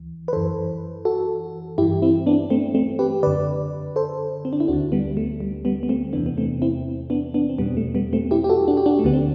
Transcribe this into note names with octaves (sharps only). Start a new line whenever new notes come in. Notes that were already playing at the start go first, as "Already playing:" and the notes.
Already playing: D2 E3
B4
F#2 E3 A4 C5
F#4 A4
G2 E3 E4 G4
C4 E4
B3 D4
A3 C4
A3 C4
G4 B4
F#2 D3 B4 D5
A4 C5
C4
D4
E4
D2 D3 D4 F#4
G3 B3
A3
G3
G3 B3
B3
A3 C4
E2 C3 E3 B3 D4
B3
A3 C4
C4 E4
B3 D4
B3 D4
C4
E2 B2 G3 B3
A3
G3 B3
A3 C4
E4 G4
G4
F#4 A4
D4 F#4
G4
D4 F#4
A3
D2 D3 B3
C4